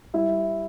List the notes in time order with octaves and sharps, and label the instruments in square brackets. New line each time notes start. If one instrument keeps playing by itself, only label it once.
[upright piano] G3 E4 E5